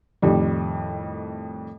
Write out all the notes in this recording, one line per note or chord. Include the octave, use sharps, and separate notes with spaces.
F2 A2 D#3 G3